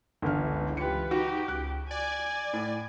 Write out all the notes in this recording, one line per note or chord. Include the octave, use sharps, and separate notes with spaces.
G1 C#2 D3 E3 F6
F4 G4 B4 C#7
D#4 F#4 G4
C#2 F#6
D5 G#5
A2